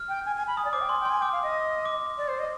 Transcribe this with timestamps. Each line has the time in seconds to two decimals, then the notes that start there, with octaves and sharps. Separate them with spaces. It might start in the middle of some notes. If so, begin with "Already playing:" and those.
Already playing: F6
0.09 G5
0.25 G#5
0.36 G#5
0.47 B5
0.57 G#5 D#6
0.65 D5
0.73 C5 D6
0.81 G5
0.89 G#5 C6
1.01 G5
1.05 G#5 C6
1.21 G5 D6
1.32 F5
1.43 D#5
1.85 D6
2.18 D5
2.28 C5
2.39 D#5